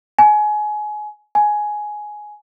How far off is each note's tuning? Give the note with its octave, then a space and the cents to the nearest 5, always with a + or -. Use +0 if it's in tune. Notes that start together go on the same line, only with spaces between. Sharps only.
G#5 +25
G#5 +10